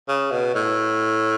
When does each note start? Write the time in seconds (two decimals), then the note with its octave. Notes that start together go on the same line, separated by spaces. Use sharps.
0.08 C#3
0.31 B2
0.55 A2